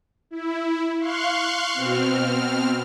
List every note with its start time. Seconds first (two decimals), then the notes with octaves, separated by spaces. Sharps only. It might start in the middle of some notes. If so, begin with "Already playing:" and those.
0.31 E4
1.00 F5 C6 C#6 F#6
1.72 B2 C4 F6